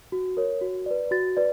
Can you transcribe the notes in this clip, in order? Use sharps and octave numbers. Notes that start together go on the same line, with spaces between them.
F#4
A#4 C#5
F#4
B4 D5
F#4 A6
B4 D5